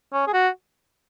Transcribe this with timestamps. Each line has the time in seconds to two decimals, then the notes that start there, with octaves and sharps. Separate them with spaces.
0.13 C#4
0.28 G#4
0.34 F#4